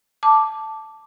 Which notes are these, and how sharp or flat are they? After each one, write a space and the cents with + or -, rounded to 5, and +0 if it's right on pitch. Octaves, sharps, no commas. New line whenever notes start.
A5 +0 D6 +0